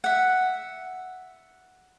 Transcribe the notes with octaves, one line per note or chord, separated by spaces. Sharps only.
E5 F#5